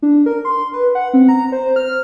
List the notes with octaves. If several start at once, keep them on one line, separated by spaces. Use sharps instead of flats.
D4
A#4
C6
B4
F#5
C4
A#5
C5
F6